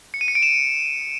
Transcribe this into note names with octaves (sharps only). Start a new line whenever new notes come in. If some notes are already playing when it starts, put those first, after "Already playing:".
C#7
D#7
C#7
D7
E7